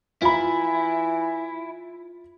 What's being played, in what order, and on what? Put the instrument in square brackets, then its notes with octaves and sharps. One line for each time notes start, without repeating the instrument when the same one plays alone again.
[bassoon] E3 [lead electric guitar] E4 [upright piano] F4 B5